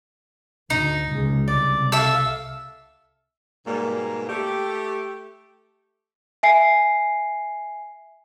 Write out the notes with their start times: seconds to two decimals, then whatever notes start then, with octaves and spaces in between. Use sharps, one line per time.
0.70 D2 D#4
1.12 C#2 G#3
1.48 C2 D5
1.92 A4 E5 F5 E6
3.66 G#2 B2 G3 A#3
4.29 A3 G4
6.43 E5 G#5 C7